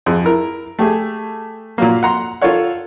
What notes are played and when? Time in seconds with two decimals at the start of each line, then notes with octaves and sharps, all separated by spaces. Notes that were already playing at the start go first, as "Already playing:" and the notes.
0.06 F2 G#4
0.25 E4 A#4
0.79 A3 G4 G#4
1.78 A#2 F#3 A#3
2.03 F#5 A#5 C6
2.42 F4 A4 A#4 C#5 F#5